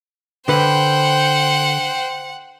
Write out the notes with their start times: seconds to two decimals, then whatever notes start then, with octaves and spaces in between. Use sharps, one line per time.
0.48 D3 B4 C5 F#5 G5